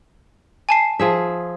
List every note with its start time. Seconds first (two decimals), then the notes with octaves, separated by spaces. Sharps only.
0.69 G#5 A5 C7
0.99 F3 G#4 E5